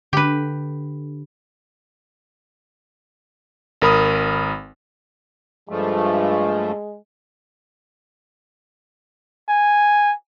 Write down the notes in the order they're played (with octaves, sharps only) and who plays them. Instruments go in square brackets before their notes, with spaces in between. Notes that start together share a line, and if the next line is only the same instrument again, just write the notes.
[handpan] D3 [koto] G4 B4
[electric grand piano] G#1 A#4 B5 D#6
[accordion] G2 F3 A3 [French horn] G#3
[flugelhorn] G#5